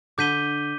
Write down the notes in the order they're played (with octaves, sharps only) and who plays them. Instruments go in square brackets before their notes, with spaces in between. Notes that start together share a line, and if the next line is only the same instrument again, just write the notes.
[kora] D3 [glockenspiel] D6 G6 B6 D#7 G7